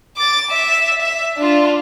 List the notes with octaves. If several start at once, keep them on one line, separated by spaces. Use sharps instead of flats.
D6 A6
E5
E5
D4 F4